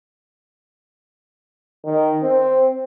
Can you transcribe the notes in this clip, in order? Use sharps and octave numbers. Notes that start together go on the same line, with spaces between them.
D#3
C4